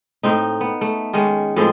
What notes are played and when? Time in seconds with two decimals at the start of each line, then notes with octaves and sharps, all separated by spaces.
0.23 A2 C4 D#4
0.61 B3
0.81 A3
1.13 D#3 G#3 C#4
1.56 A2 F3 G#3 C4